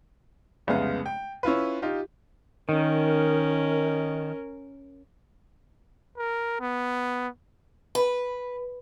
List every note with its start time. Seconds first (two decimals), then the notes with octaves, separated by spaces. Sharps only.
0.67 F1 C2 C#3 G#3 B3 F5
1.06 G5
1.43 C#4 E4 F4 B4
1.82 D#4 F4 G4
2.69 D#3 C#4 A#4
6.18 A#4
6.60 B3
7.95 B4